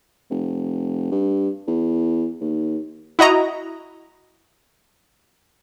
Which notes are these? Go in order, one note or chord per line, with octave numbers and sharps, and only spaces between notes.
F1
G2
E2
D#2
E4 F#4 D#5 A#5